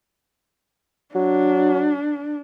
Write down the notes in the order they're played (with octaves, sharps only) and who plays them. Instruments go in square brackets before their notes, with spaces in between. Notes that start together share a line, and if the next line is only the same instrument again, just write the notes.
[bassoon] F#3 [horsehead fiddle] D4